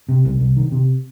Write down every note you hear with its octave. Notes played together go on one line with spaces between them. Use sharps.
C3
C2
C2
D#3
C3